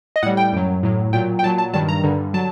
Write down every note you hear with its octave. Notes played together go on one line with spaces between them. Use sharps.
D#5
A2 G3 F#5
G5
F#2 F#3
A2 F#3
A#2 F#3 G5
G5
A#2 F#3 A5
A5
G2 D#3 G3 A5
A#5
G2 D3 G3
F#3 A5